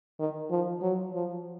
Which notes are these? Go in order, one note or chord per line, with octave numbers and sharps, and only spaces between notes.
D#3
F3
F#3
F3